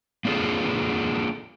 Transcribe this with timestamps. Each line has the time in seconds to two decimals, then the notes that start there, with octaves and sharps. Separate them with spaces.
0.25 A#3 D4 F4 G#4 A4